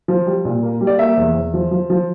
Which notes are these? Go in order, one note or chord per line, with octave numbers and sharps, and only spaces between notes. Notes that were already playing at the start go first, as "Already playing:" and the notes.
F3
G3
A#2
A#3
G3
D5
A#3 E5
E2
E2
F3
F3
F3